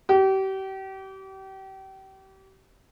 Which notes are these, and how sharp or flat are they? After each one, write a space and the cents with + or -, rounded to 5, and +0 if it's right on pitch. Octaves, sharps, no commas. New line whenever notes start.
G4 -35